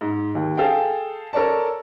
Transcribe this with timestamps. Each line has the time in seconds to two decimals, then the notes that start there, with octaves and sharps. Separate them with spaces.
0.01 G#2
0.35 D#2
0.57 G#4 A4 F5 G5
1.33 A4 A#4 C#5 D5 A5